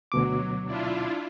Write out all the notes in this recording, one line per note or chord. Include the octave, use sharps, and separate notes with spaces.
D2 B2 F#3 D6
D4 E4 F4